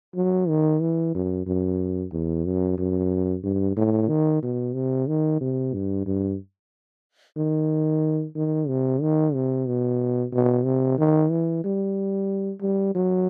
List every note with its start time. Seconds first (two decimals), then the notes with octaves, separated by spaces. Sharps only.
0.16 F#3
0.49 D#3
0.81 E3
1.15 F#2
1.47 F#2
2.13 E2
2.46 F#2
2.78 F#2
3.44 G2
3.77 A2
4.09 D#3
4.43 B2
4.75 C3
5.07 D#3
5.41 C3
5.74 G2
6.06 G2
7.37 D#3
8.36 D#3
8.68 C3
9.01 D#3
9.34 C3
9.67 B2
10.33 B2
10.65 C3
10.99 D#3
11.31 E3
11.64 G3
12.61 G3
12.95 F#3